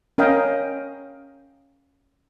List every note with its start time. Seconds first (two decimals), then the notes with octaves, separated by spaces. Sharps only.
0.18 C#4 A#4 D#5 F5 G5